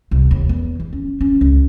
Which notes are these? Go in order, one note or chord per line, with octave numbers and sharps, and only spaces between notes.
C2
D#2
E2
E2
C#4
C#4
C#2